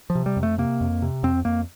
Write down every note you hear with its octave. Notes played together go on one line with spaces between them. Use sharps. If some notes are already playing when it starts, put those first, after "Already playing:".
F3
C3
G3
F2
A3
C3 A#3
F2
C3
F2 C4
F2 A#3